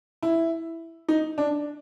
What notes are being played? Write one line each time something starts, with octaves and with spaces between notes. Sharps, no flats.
E4
D#4
D4